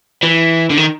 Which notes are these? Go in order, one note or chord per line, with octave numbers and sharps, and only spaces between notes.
E3
D3
D#3